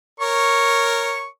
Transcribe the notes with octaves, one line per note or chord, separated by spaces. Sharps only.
A#4 C#5 C#6